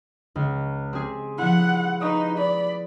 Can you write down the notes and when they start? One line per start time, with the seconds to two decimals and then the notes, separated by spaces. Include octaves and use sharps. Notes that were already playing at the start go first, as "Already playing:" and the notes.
0.36 C#2
0.93 C4 G4 G#4
1.38 F3 B3 E4 F#5
2.01 D#4 B4 C#6 D#6
2.37 D5 B5